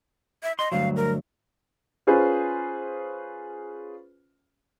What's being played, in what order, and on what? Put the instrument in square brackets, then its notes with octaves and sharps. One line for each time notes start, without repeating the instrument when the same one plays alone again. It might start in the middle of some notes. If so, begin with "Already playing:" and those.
[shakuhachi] E5
[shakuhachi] D#5 [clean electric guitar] C6
[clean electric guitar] D2 G2 F#3 [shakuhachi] F5
[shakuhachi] A#4
[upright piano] C#4 F4 G#4 B4 C5